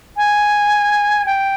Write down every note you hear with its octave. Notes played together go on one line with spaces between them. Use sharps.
G#5
G5